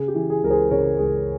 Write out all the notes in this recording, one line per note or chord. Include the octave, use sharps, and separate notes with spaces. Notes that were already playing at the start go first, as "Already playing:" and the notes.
Already playing: C#3 G#4
G4
E3
G#4
C#2 A#4
G#4 C5
C#3 A#4 C#5
C#2 G#4